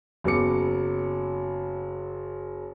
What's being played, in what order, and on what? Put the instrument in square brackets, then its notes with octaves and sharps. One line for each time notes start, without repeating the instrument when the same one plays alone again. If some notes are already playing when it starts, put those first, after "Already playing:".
[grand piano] F#1 F#3 B3 D6 C#7